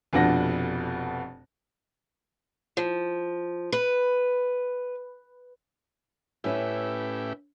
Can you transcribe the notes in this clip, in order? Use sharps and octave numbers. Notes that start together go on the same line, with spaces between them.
F1 F2 B2 D4 F#5 A#6
F3
B4
A2 C#4 E4 G4 B4 E5